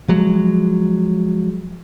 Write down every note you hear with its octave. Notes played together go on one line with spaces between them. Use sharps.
F3 F#3 G#3